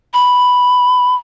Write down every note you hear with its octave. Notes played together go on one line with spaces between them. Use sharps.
B5